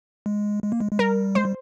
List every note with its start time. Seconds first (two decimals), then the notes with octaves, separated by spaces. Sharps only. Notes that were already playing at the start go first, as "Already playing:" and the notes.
0.26 G#3
0.64 G#3
0.72 A#3
0.80 G#3
0.92 G#3
0.99 G3 A#4
1.35 G#3 C5
1.45 G3